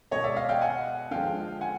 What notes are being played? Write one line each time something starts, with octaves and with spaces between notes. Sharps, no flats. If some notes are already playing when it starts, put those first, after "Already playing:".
B2 G#3 C#5 D#5
D5 E5
D#5 F5
F5 G5
F#5 G#5
D3 F3 G#3 F5 G5
F#5 G#5